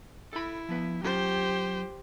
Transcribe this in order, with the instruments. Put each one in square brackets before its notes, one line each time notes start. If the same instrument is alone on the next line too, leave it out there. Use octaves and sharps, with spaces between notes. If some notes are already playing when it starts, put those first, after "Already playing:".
[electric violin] E4 [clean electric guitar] A4 B5
[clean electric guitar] F3 B3 B4
[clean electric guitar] F#3 C#4 F4 [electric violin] G4 C5